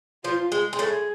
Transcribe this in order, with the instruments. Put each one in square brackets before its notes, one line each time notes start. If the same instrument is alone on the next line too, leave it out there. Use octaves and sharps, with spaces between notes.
[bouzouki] F3 [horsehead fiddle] F4
[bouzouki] G#3
G#3
[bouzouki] A2 A3 [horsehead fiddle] G#4